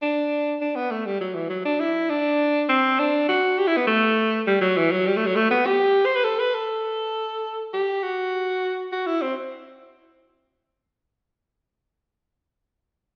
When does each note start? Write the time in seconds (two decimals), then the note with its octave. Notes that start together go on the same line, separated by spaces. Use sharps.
0.02 D4
0.61 D4
0.75 B3
0.91 A3
1.06 G3
1.21 F#3
1.35 E3
1.50 F#3
1.65 D4
1.80 E4
2.10 D4
2.69 C4
2.99 D4
3.28 F#4
3.58 G4
3.67 E4
3.77 B3
3.87 A3
4.47 G3
4.61 F#3
4.77 E3
4.91 F#3
5.07 G3
5.16 A3
5.26 F#3
5.36 A3
5.51 B3
5.66 G4
6.06 C5
6.16 B4
6.24 A4
6.39 B4
6.55 A4
7.73 G4
8.03 F#4
8.92 F#4
9.06 E4
9.22 C4